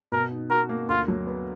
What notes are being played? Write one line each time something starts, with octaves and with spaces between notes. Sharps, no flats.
B2 A#4
D#4
F#4 A#4
A#3
D2 F4
F#3
B3